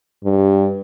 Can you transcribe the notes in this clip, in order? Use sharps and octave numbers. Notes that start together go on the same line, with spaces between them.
G2